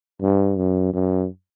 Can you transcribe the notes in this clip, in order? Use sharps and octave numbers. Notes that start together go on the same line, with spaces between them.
G2
F#2
F#2